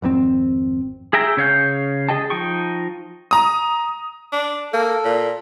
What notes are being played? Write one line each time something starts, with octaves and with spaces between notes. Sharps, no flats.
G#1 F2 D#3 C4
G#4 E5 G5 A#5
C#3 C#5 F5 G6
G#4 D#5 G5 A5
F3 D#4 G5 C#6
A#5 D#6
D4
A#3 A4
A#2